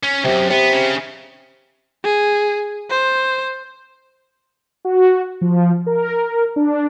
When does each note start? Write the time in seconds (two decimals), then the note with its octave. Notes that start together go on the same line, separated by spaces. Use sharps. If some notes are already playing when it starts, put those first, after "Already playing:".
0.03 C#4
0.24 C2 F#2 C3
0.50 C3 B3
0.72 C#3
2.04 G#4
2.90 C5
4.85 F#4
5.41 F3
5.86 A#4
6.56 D4